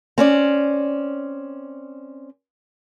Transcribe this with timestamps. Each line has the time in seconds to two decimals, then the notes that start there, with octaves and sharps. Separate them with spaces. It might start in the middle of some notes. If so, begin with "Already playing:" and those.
0.18 C4 C#4 D5